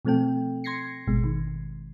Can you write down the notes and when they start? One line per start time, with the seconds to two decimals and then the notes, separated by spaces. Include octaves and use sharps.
0.05 B2 F3 A3 C4 A4 G5
0.64 C6 G#6 A#6 C7 C#7
1.07 G#1 B2 G#3
1.24 D#3